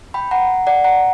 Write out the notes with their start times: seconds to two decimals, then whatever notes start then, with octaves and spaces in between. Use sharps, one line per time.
0.14 G5 B5
0.31 F#5 A#5
0.67 D5 F#5
0.84 F#5 A#5